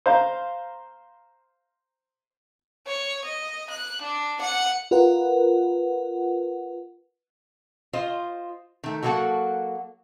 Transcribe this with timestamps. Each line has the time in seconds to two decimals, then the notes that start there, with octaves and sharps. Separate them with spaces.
0.06 C5 F5 A#5
2.87 C#5
3.24 D#5
3.70 F#6
4.02 D4
4.41 F#5
4.91 F4 A#4 B4 F#5
7.93 F4 C5 D#5
8.84 D#3 A3
9.03 F#3 G3 A#3 F#4 A4 F#5